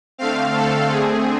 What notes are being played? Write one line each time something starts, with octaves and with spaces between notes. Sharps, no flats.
D3 A3 C4 F5
A4
D3 A3 C4 G#4